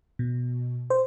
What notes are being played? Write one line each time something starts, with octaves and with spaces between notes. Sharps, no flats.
B2
C5